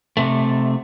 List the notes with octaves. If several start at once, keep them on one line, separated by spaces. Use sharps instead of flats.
C3 A3